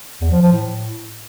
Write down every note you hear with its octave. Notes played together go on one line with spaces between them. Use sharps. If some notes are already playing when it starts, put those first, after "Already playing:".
E2
F3
F3
A2